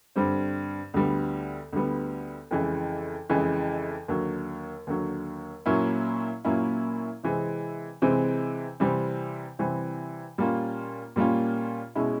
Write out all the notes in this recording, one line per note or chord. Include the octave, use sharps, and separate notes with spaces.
G2 D3 G3 C4
D2 D3 G3 B3
D2 D3 G3 B3
F2 C#3 E3 G#3
F2 C#3 E3 G#3
D#2 D3 F#3
D#2 D3 F#3
A#2 F#3 A#3 C#4 E4
A#2 F#3 A#3 C#4 E4
C3 E3 G#3 C4
C3 E3 G#3 C4
C3 E3 G3 C4
C3 E3 G3 C4
A#2 G3 A#3 C#4 F4
A#2 G3 A#3 C#4 F4
B2 G#3 C#4 E4